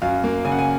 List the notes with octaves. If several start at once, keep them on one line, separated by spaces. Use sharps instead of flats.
F#2 F5
A#3
C#3 G#5
F#5
G#5